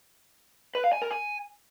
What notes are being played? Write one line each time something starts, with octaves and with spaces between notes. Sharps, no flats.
B4
F5
G#5
A#4
G#5